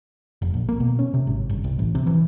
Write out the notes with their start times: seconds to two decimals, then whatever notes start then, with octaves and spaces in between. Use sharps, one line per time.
0.42 F1
0.54 A#1
0.69 A#3
0.80 B2
0.99 C#4
1.14 C3
1.27 G#1
1.50 G1
1.64 C2
1.79 A1
1.95 C3
2.07 E3